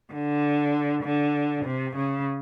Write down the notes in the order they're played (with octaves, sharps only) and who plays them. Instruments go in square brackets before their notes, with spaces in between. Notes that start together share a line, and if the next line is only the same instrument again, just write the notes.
[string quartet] D3
D3
C3
C#3